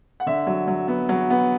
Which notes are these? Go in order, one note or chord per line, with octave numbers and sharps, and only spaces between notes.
F#5
D3 E5
F#3
F#3
B3
F#3
B3